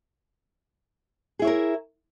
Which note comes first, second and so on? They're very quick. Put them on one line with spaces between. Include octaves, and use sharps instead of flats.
G#4 E4 C#5 A#4